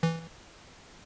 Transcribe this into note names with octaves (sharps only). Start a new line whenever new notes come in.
E3